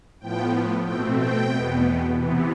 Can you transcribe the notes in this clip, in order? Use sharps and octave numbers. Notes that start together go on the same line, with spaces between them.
A2 F3 B3 G5
B2 A3 C4 G5
G5
E2 B2 B3
C3 E3 B3